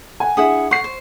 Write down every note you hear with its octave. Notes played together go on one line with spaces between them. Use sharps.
F#5 G#5
D4 E4 G#4 F#5 D#6
F#5 C#6 C7
C5